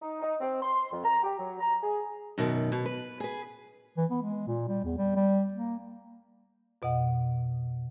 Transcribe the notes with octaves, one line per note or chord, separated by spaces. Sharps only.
D#4
D#4
C4
C6
F2
A#5
G4
F#3
A#5
G#4
F#2 B2 D#3
B2
B4
G#4 B4
E3
B3
G#3
A#2
G3
E2
G3
G3
A#3
F2 B2 D#5 F#5